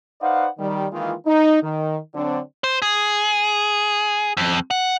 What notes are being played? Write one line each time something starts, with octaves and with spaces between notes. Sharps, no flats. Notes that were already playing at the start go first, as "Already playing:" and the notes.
D#4 B4 C5 D5 F5 F#5
D#3 G3
D#3 E3 G#3 A#3 F4
D#4
D#3
D3 F#3 C4 D4
C5
G#4
F2
F#5